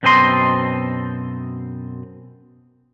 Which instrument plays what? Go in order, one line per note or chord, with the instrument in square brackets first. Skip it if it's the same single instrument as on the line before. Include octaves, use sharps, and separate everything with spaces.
[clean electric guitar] F#2 B2 C4 A4 D#5 C6